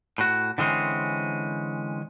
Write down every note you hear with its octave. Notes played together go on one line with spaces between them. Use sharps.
A2 F#4
D3 E3 G#3 C4 C#4